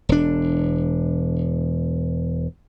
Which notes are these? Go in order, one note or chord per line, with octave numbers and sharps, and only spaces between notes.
E1 D4